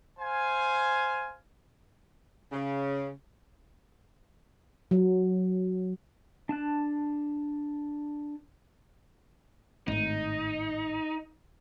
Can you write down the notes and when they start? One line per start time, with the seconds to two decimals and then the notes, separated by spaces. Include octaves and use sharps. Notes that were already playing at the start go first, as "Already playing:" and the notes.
0.20 C5 F5 G#5
2.52 C#3
4.91 F#3
6.49 D4 A5 F#6
9.88 G#1 A2 D#4